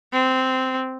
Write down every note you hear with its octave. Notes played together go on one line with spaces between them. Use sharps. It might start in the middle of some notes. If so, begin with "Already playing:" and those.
C4